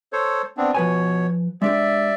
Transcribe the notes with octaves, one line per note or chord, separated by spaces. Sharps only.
A4 C5 C#5
B3 C4 D4
B2 F3 B4 C#5 G#5
G#3 D4 G4 D5 E5